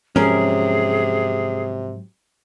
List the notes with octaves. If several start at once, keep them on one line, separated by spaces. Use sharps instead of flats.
G#2 C3 F3 F#3 C#4 G#4 A#4